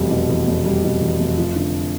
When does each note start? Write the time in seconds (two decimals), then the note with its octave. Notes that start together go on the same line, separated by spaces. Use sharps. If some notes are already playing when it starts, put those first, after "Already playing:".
Already playing: F1 E2 B2 G3
0.11 B2
0.29 E2
0.47 F1
0.66 G3
0.84 B2
1.02 E2
1.20 F1
1.38 F3
1.56 D3